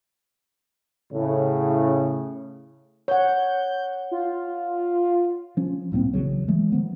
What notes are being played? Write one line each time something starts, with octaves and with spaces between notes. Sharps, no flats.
A2 C#3
C#5 F#5 G6
F4
F3 C#4
C2 A2 A#3 C4
A#1 E2 C#3 F#3
E3 G#3 A3
D#3 F3 B3